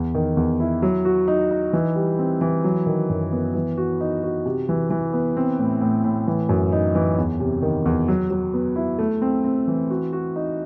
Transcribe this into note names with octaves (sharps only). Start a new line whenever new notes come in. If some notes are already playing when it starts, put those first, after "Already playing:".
Already playing: E2
D#3
E2
E4
F#3
F#4
D#4
D#4
E3
G3
C4
E3
F#3
D#3
F#2
B3
E3
F#4
D#4
F#4
C3
E3
E3
B3
C4
A2
A2
A2
E3
F#2
D#4
E3
E2
C3
D#3
E2
F#3
F#3
B3
E4
A3
C4
C4
E3
F#4
F#4
D#4